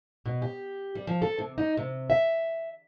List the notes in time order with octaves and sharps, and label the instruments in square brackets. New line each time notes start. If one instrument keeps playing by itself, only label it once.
[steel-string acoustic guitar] B2
G4
G3
F3
A4
C3
D#4
C3
E5